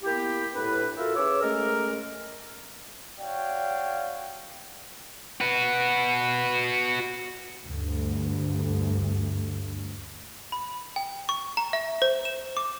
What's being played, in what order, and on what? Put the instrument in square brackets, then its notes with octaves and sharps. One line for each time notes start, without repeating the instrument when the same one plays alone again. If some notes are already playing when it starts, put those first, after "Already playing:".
[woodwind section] A#3 B3 E4 G4
A2 D4 B4
F4 F#4 A4 A#4 E5
C#4 G#4 B4 C#5 D6 E6
G#3 A3 C#4 A4 A#4
[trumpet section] F#4 C#5 D5 F5 G5
[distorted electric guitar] F#4 B4
[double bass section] D2 G2
[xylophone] B5
G5
C#6
A#5
E5
C5
E7
D6